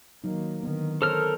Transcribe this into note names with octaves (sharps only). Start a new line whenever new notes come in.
D#3 F#3 A#3 D#4
D3 D#3 B3
A4 A#4 C5 C#5 F6